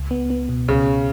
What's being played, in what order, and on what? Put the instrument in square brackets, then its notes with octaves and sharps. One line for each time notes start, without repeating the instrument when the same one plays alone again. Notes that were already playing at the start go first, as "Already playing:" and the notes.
Already playing: [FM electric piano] C#2
B3
B3
B2
[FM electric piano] C#2 [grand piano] C#3
[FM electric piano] C#2